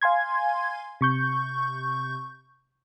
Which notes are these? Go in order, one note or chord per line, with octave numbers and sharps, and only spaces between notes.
F5 G#5 C6 G#6
C3 C#6 G6